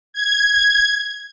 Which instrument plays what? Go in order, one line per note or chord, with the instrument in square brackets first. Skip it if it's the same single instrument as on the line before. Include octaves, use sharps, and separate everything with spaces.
[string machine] G#6